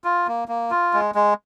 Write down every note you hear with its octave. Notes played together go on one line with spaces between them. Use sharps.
F4
A#3
A#3
F4
G#3
G#3